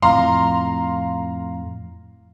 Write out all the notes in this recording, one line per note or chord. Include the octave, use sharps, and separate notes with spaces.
F2 A2 F5 A#5 C6